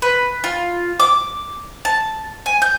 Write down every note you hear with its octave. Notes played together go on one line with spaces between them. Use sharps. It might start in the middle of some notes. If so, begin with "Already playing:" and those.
B4
F4
D6
A5
G#5
G6